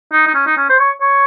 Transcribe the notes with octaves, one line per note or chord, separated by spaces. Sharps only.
D#4
D#4
C#4
D#4
C#4
C5
C#5
C#5